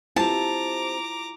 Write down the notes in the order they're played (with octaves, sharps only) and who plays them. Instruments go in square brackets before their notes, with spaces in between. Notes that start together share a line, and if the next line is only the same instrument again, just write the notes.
[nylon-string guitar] C4 G4 C5 [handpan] E4 F4 [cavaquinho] A5 [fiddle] A#5 D6